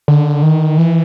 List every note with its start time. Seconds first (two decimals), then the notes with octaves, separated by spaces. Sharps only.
0.08 D3
0.43 D#3
0.78 E3